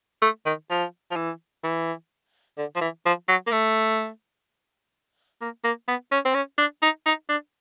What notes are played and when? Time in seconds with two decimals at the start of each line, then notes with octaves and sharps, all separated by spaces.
0.22 A3
0.46 D#3
0.70 F3
1.11 F3
1.16 E3
1.64 E3
2.58 D3
2.76 F3
2.81 E3
3.06 F3
3.28 F#3
3.47 A#3
3.52 A3
5.42 A#3
5.64 A#3
5.88 B3
6.12 C#4
6.25 C4
6.35 C#4
6.58 D4
6.82 D#4
7.06 D#4
7.29 D4